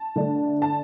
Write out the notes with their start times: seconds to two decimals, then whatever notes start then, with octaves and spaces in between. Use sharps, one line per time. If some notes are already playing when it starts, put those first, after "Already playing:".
Already playing: A5
0.16 D3 A3 D4
0.62 A5